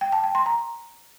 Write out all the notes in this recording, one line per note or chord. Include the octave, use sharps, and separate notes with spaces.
G5
A5
G5
C6
A#5